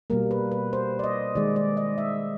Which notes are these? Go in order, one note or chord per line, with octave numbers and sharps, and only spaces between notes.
B2 G3 A#3 A#4
B4
B4
C5
D5
D#5
D#3 G#3 D5
D5
D#5
E5